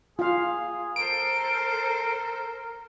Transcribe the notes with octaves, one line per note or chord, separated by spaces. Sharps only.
F4 G#4 F5
A4 A#4 C5 D7